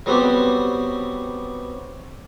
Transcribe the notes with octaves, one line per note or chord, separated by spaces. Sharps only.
F#3 G3 B3 C4 F#4 G4